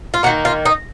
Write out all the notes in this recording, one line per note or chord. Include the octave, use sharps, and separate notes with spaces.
F4
D#3 A#3 F#4
F4
D#4